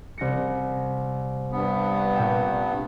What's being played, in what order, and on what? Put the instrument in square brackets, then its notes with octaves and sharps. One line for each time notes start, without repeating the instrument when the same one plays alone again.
[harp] C2 A#6 C#7
[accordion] G2 B3
[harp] A#2 G5 E7